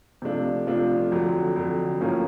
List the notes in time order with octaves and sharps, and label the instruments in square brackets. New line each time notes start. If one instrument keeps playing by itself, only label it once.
[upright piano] C3 F3 A3 D4 F4
C3 F3 A3 D4 F4
F2 D3 F#3
F2 D3 F#3
A2 F3 A#3 C#4 F4